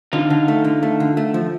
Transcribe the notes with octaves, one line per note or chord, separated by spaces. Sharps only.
D3 D#4 F4
D3
A3
D3
A3
D3
A3
F3